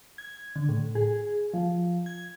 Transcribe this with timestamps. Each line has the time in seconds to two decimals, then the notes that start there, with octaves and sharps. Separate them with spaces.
0.18 G#6
0.56 D3
0.69 A2
0.95 G#4
1.54 F3
2.06 G#6